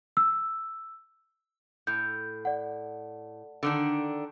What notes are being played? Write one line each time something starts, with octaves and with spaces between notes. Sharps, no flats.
E6
A2 G6
D5 F#5
D3 D#3 D4